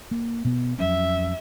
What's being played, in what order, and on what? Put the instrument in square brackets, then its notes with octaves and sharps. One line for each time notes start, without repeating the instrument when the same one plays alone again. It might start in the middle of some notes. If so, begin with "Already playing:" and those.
[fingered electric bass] A#3
B2 B3
[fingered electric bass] F2 F#3 C#4 [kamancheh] E5